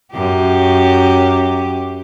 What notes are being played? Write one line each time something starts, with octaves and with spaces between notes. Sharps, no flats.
F#2 G4